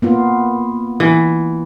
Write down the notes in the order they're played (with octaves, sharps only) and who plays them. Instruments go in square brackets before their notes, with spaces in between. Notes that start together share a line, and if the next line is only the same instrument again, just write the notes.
[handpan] A#3 B3 F4
[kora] E3